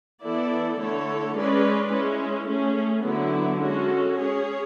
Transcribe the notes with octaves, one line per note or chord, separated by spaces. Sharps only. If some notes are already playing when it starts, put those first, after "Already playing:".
E3 B3 E4 A4 D5
D3 A3 E4 A4 C#5
G#3 C#4 G#4 B4 D5
G#3 C#4 E4
A3 C#4 G#4
D3 F#3 B3 E4
G#3 C#4 F#4 A4
C#4 G#4 C#5